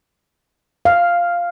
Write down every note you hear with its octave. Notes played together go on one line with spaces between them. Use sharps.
F5